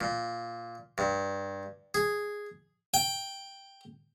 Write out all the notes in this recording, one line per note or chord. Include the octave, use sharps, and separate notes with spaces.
A#2
G2
G#4
G5